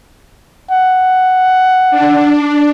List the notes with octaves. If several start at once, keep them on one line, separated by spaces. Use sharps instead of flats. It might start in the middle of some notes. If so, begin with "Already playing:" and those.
F#5
D4